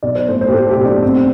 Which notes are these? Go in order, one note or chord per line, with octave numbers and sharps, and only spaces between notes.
B1 D5
C5
A2 C5
C5
G4
A2 A4
G4
B1
D4
A1 C4